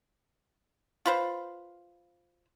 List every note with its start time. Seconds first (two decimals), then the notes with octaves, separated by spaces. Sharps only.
1.06 F4 B4 C5